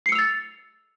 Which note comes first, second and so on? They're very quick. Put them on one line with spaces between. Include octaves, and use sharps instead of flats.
C7 C#7 E6 F7 A6